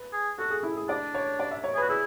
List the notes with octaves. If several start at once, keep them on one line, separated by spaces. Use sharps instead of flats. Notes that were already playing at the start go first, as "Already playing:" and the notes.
Already playing: B4
G#4
F#4 A4
G#4
E4
G#4
D4 D5
C#5
D5
E5
C#5
G#4
F#4 B4
E4 G#4